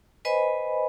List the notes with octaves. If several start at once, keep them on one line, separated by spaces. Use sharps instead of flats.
B4 C5 D#5 G#5 B5